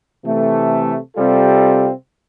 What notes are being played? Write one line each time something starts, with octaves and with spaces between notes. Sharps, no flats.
C3 E3 A3
C3 G3 C4 F4 A4